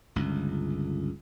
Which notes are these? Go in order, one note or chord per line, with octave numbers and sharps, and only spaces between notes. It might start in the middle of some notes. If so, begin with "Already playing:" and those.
G1 C#2